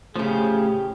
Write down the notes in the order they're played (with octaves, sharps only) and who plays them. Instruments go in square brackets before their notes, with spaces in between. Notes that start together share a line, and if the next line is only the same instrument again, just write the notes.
[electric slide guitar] A2 A3 [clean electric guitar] C#3 F3 [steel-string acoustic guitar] C#4 G4 [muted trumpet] G#4